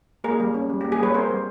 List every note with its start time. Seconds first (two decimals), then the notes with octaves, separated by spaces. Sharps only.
0.24 A#3 G#4 A#4
0.40 G3
0.54 C#4
0.70 G3
0.81 A#3 G4
0.92 G#4
0.99 G3 B4 C#5
1.14 C4 A#4 C5
1.30 G3